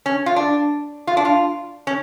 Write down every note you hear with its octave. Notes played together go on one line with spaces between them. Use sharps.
C#4
F4
D4
F4
D4
F4
C#4